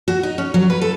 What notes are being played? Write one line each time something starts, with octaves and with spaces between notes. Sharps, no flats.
F#4
D#4
C#4
F#3
B4
A4